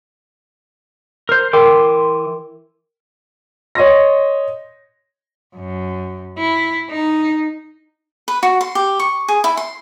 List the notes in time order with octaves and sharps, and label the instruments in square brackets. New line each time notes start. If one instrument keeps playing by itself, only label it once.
[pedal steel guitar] A#4 C5
[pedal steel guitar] E3 C6 D6 [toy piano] A#4 G5
[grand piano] C#5 D#5 C6 A#6
[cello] F#2
E4
D#4
[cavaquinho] B4
F#4
C6
G4
C#6
G#4
E4
C6